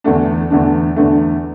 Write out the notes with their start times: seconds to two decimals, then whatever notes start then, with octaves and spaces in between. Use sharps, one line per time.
0.04 E2 D3 A3 D4
0.50 E2 D3 A3 D4
0.96 E2 D3 A3 D4